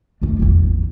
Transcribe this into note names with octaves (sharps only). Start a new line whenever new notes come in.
A3 D4
A1 E2